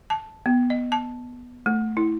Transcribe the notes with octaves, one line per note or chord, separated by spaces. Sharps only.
A5
B3
D#5
A5
A3
E4